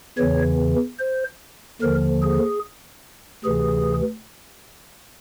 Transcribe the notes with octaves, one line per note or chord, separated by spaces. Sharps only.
E2 C#3 E3 C#5
C5
D#2 D3 F3 A#4
G#4
D2 C3 E3 G#4